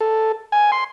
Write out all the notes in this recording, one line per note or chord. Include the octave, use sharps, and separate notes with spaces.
A4
G#5
C6